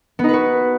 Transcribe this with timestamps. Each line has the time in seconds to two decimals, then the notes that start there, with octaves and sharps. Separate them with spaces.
0.19 B3
0.24 D#4
0.29 B4
0.33 F#4